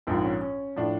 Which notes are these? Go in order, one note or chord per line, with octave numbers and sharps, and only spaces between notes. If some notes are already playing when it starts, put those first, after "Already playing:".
A#1 G#2 F3 C4
C#4
C#4
A2 F3 D4